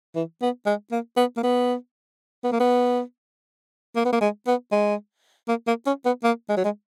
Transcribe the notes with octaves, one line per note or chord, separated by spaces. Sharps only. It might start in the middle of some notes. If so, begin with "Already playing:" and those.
E3
B3
G#3
A#3
B3
A#3
B3
B3
A#3
B3
A#3
B3
A#3
G#3
B3
G#3
A#3
A#3
C#4
B3
A#3
G#3
F#3
G#3